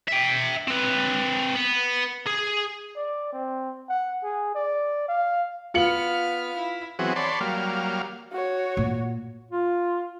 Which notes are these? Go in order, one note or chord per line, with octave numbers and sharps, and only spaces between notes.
E5 G5
C4 B4
B3
G#4
D5
C4
F#5
G#4
D5
F5
B3 F4 F6 C#7 F#7
E4
E3 F#3 B3 C4 F#4 G#4
C#5 D5 A5 B5 C6
F#3 G3 A#3 F5
F#4 C#5
A#2
F4